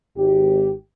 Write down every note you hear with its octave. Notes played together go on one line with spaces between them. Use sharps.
G#1 G4